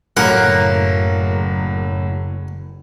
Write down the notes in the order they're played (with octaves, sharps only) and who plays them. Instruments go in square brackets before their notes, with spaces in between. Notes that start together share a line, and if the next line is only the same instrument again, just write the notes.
[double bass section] F#1 [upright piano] A2 F#3 [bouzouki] A#3 [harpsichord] F#5